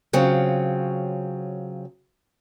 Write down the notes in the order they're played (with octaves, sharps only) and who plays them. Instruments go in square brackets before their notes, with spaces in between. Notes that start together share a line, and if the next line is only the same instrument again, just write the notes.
[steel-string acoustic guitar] C#3 F#3 C4 F4